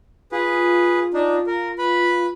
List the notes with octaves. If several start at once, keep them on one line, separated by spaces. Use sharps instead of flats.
F4 G#4 B4
D4 D#4
A#4
B4 B5